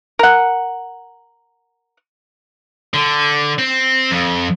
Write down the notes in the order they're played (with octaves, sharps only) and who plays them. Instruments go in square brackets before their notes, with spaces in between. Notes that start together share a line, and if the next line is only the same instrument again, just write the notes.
[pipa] A#4 F#5
[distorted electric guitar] D3
C4
F2